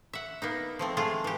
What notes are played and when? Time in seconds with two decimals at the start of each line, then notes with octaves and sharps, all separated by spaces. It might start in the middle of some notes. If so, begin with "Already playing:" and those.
0.13 E5 F#5
0.42 A#3 B3 D#4
0.79 F3 A3 C4
0.97 G#3 A3 F4 G#4
1.24 E3 G4